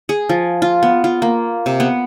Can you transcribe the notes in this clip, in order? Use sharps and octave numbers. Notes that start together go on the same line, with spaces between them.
G#4
F3
F4
B3
F4
A#3
C3
B3